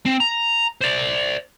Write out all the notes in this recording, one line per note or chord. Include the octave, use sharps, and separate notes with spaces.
C4
A#5
C5 D5